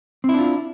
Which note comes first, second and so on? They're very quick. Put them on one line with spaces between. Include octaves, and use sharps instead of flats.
C4 E4 D4 F4